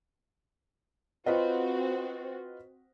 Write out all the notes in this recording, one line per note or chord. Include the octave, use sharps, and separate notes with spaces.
C4 F4 F#4 B4 D#5